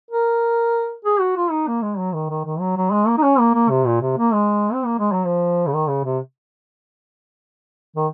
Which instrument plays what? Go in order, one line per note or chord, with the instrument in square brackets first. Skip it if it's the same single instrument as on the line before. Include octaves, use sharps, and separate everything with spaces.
[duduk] A#4
G#4
F#4
F4
D#4
A#3
G#3
F#3
D#3
D#3
D#3
F#3
F#3
G#3
A#3
D#4
C#4
A#3
A#3
C3
A#2
C3
A#3
G#3
C4
A#3
G#3
F#3
F3
C#3
D#3
C#3
C3
D#3